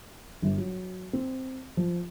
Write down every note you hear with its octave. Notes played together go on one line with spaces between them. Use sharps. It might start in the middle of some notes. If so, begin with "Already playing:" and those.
G1
F#3
C4
F3